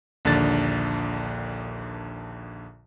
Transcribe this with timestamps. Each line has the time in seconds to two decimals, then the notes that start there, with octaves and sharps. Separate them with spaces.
0.25 A#1 D#2 D3 D4 A6